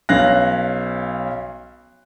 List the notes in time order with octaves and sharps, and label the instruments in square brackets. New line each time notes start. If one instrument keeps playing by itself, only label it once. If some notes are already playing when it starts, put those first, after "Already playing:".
[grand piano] B1 C#4 F5 F#6 A#6